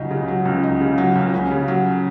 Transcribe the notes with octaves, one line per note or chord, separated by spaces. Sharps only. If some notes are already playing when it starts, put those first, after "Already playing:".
Already playing: C#2 C#3 F#3 D#4
C#3
F#3
C#2
D#4
C#3
F#3
C#2
C#4
C#3
F#3